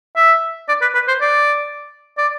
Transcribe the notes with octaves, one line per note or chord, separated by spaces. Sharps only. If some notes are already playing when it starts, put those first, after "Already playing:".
E5
D5
B4
B4
C5
D5
D5